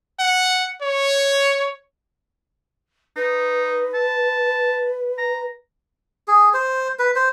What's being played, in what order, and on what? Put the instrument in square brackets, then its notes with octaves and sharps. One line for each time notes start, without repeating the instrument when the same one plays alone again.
[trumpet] F#5
C#5
[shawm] D#4 [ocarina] B4
[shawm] A5
A#5
[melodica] G#4
C5
B4
C5